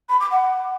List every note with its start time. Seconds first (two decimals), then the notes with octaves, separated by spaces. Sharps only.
0.09 B5
0.20 D6
0.31 F#5